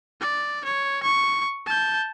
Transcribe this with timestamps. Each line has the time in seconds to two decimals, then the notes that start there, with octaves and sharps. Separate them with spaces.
0.21 D5
0.64 C#5
1.03 C#6
1.66 A5 G6